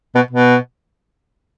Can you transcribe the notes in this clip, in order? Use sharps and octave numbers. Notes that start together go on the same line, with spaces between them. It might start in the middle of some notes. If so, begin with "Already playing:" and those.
B2
B2